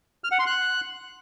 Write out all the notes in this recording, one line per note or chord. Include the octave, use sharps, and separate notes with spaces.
F6
F#5
C6
F#6